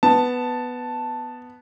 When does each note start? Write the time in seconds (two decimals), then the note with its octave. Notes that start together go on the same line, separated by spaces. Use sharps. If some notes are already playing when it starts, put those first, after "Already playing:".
0.03 B3 A5